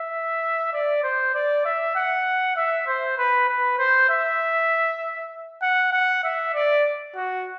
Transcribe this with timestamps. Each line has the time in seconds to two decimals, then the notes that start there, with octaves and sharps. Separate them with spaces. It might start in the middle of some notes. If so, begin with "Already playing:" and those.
Already playing: E5
0.73 D5
1.03 C5
1.34 D5
1.65 E5
1.96 F#5
2.56 E5
2.87 C5
3.18 B4
3.48 B4
3.78 C5
4.09 E5
5.62 F#5
5.93 F#5
6.23 E5
6.54 D5
7.15 F#4